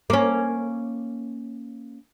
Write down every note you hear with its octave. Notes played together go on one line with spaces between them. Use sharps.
A#3 C#4